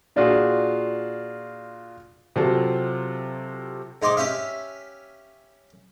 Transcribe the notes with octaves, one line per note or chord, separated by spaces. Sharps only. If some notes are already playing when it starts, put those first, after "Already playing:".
A#2 D4 F4 F#4 G#4
C3 F#3 C4 F4 A4
G#2 D#4 C6 D6
C#4 G4 E5 F5